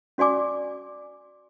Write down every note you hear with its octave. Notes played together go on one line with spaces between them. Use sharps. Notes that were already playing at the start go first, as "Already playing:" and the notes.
C#4 F#4 D5 G#5 D6